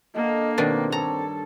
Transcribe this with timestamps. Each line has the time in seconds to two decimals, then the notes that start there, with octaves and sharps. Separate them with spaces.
0.15 D3 A#3 D#5
0.58 B2 D#3 C4 D4
0.92 G2 A4 C#5 A#5